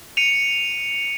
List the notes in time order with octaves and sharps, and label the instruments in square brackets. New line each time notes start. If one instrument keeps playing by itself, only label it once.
[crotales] C#7 D#7 F7